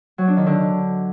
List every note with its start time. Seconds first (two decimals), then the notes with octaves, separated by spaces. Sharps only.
0.18 F#3
0.28 D4
0.37 D#3
0.46 D3